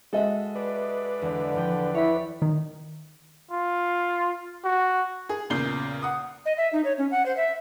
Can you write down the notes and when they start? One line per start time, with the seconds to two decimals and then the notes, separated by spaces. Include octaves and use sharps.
0.13 G#3 F#4 A4 D#5 E5
0.55 B4 D5
1.22 E2 D3
1.55 E2 F3 G5
1.95 E4 C#5 B6
2.42 D#3
3.51 F4
4.64 F#4
5.29 G#4
5.50 E2 A#2 C#3 G6 C7 G7
6.02 F#5 D#6
6.45 D#5
6.57 E5
6.73 D#4
6.85 C#5
6.98 C#4
7.11 F#5
7.26 C5
7.37 E5